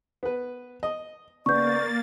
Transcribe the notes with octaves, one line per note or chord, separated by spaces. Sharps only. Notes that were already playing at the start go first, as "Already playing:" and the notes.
B3 B4
D#5
C#3 A#3 B3 D5 C#6 G6 A6